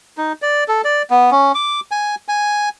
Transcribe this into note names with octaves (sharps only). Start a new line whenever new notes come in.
D#4
D5
A4
D5
B3
C#4
D6
G#5
G#5